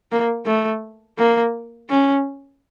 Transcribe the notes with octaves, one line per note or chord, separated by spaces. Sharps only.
A#3
A3
A#3
C#4